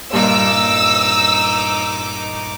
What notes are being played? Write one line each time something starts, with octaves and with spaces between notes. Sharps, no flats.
G2 A#2 D#4 D6 E6